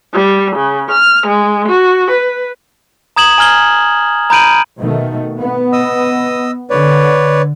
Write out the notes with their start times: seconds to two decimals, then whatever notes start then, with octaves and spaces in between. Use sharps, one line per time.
0.13 G3
0.55 C#3
0.90 F6
1.27 G#3
1.69 F#4
2.10 B4
3.16 A#5 D#6 G#6 E7 F#7
3.38 G#5 A#5 F6 G#6 G7
4.30 A#5 B5 G6 D7 D#7 F#7
4.80 B2 D#3 A3
5.37 B3
5.73 D#5 D#6 E6
6.70 D3 B4 C#5 D5